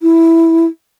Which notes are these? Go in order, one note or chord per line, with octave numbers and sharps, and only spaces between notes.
E4